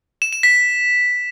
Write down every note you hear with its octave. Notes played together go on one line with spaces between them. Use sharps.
E7
E7
B6